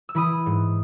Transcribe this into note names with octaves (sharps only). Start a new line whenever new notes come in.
E6
E3 B5 D#6
G#2